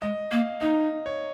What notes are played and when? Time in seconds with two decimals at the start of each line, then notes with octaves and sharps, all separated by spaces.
0.02 G#3 D#5
0.31 A#3 F5
0.61 D#4 D#5
1.06 C#5